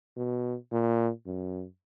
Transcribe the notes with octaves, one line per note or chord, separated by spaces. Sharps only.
B2
A#2
F#2